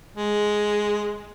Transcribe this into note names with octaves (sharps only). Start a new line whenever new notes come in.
G#3